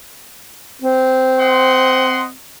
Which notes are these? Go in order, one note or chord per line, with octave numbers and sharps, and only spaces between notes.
C4
D#5 F#5 C6